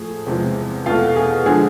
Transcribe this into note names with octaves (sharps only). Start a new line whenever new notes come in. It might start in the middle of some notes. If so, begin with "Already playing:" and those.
Already playing: A2 F3 A3 G#4
E2 C3 F3 G#3
E2 B2 A3 F4 F5
G#4
D3 F3 G#3 G#4